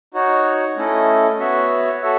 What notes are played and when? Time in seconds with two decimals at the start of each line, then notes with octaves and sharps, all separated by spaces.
0.14 D#4 F#4 C#5
0.77 A3 C#4 E4 A4 D#5
1.39 B3 F#4 C#5 E5
2.02 F#4 A4 C#5 E5